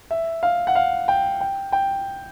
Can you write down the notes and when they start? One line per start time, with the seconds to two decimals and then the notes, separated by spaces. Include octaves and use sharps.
0.11 E5
0.43 F5
0.67 F#5
0.75 F5
1.08 G5
1.41 G5
1.72 G5